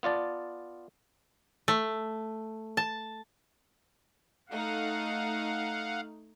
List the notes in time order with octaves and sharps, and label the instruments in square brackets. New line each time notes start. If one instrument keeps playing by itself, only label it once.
[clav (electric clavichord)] B3 F4 D5 A5
[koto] A3
A5
[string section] A3 D#4 [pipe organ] F5 F#5